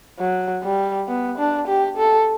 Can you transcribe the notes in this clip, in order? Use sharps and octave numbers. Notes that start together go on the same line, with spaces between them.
F#3
G3
B3
D4
G4
A4